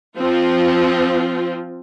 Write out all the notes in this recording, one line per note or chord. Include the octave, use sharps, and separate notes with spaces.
F3 C4 F4